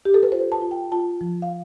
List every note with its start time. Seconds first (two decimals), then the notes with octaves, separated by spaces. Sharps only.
0.05 G4
0.14 A4
0.23 B4
0.32 F4 C5
0.52 A5
0.62 F4
0.71 G5
0.92 F4 A5
1.21 F3
1.42 F5